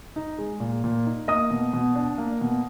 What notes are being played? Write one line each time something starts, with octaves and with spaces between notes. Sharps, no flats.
D#4
G#3
A#2
A#2
D#4
A#3 D#5 D#6
B2
B2
D4
A#3
B2